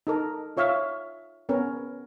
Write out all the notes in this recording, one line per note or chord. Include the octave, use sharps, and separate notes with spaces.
D#4 A4 A#4
F4 C#5 E5 F5
B3 C#4 A#4